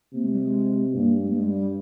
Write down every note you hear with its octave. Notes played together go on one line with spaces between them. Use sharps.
C3 A#3
G#3
G3
G#3
G2 A#3
G#3
A#3
G2 G#3
G3